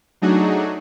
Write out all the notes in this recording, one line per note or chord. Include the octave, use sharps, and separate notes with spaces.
F#3 A3 D4 D#4 F#4 G#4